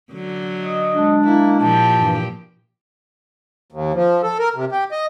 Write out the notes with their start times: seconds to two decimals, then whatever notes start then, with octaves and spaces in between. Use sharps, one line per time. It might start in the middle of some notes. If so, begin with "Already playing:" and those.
0.12 D3 F#3
0.61 D#5
0.95 G#3 D4
1.25 A#3 E4
1.60 A#2 F3 G4 A5
1.96 G2 E3
3.72 D#2
3.94 F3
4.23 A4
4.39 A#4
4.55 C3
4.72 G4
4.92 D#5